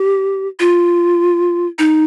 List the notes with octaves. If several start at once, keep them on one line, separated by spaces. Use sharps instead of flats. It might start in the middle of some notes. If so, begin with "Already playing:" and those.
Already playing: G4
F4
D#4